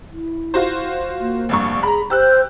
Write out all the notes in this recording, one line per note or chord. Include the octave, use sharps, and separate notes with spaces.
E4
F4 F#4 C5
A#3
F1 G2 C#6
G#4 A#5 B5
G4 C5 E6 F#6